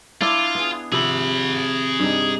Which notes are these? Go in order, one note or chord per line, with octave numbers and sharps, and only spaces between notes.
D4 E4 F4 D5
B3 G#4
C3 F3 G#4 B5
G2 G3 D#4